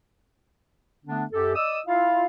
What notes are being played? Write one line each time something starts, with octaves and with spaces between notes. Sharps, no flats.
D3 A3 B3 D4
F#2 G4 A4
D5 D#5 D#6 E6
E4 F4 F5